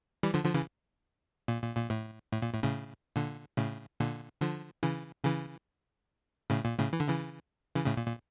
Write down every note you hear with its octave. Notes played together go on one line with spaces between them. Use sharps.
E3 G3
D3 F3
D3 F3
C#3 E3
A#2
A#2
A#2
A2
A2
A#2
A2
A2 C#3
A#2 D3
A2 C#3
A#2 D3
D3 F3
C#3 E3
C#3 E3
A2 C#3
A#2
A2 C#3
E3
D3
C#3 E3
C#3 E3
A2 C#3
A#2
A#2